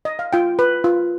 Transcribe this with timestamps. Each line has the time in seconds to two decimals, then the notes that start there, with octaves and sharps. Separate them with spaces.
0.05 D#5
0.19 F5
0.33 F4 G5
0.59 B4
0.84 F4